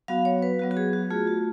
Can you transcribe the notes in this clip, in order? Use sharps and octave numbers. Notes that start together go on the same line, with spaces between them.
F#3 B3 F#4 F5
C#5
B4
F#3 B3 F#4
F#4
G#4
F#4
A3 F4 G#4
F#4